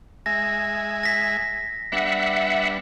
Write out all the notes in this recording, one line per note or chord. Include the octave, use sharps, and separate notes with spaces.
G#3 E5 G#5 A#6
A#6 B6
G3 B3 D4 E5 F#5